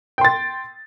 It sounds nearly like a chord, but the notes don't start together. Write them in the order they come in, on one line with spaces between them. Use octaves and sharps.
G5 C6 A6